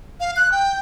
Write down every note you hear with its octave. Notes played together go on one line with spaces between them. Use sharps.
F5
F#6
G5